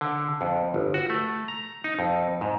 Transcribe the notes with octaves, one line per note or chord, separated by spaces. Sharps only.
D3
F2
G1
F#4
A3
A#5
D#4
F2
G#2